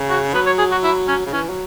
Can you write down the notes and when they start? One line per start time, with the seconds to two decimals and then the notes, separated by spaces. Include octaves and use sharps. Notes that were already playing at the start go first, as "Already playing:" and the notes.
Already playing: C#3
0.10 F#4
0.34 F#3 B4
0.46 C#5
0.59 G#4
0.72 F#4
0.84 E4
1.08 C#4
1.26 C#3
1.33 E3 C#4
1.49 F#3